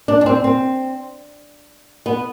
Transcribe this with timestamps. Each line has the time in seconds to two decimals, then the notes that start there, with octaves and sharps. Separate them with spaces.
0.08 D4
0.21 D4
0.26 C4
0.44 C4
2.06 B3